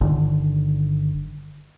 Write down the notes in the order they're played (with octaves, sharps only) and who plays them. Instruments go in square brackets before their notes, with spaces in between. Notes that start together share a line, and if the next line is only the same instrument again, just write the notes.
[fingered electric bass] G1 D3 D#3